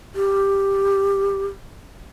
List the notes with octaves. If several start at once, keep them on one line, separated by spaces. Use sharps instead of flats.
G4